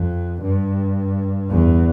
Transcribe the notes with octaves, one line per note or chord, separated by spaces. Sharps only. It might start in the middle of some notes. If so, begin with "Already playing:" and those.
Already playing: F2
G2
E2